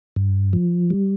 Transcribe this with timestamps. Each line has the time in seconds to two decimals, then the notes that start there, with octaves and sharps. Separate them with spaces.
0.16 G2
0.53 F3
0.90 G3